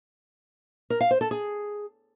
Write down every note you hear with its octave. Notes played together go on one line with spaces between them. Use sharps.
A#4
F5
C5
A4
G#4